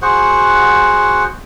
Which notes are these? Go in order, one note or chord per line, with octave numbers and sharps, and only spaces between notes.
F#4 G#4 C5 F#5